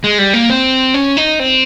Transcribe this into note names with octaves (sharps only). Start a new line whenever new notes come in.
G#3
G3
A#3
C4
C#4
D#4
C4